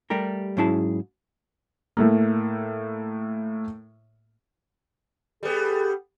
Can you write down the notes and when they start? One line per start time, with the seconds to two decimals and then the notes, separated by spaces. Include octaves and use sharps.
0.10 G3 A3 G4 A#4
0.57 G#2 F#3 C#4 E4 G#4 A5
1.97 A2 A3 A#3
5.43 G3 B3 G#4 A4